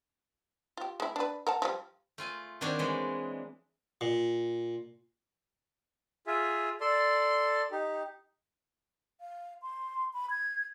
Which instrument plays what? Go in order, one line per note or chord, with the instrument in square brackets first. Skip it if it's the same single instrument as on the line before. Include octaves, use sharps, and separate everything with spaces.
[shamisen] F4 G4
G#3 E4
D4 B4
A#4 F#5 A5
F3 G3
[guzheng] A3 F4 G#5
D#3 A#3 C4 D4 F#4 C#5
E3 G#3
[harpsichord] A#2
[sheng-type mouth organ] F4 G#4 E5
A4 D5 C6
D#4 G4
[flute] F5
C6
B5
G#6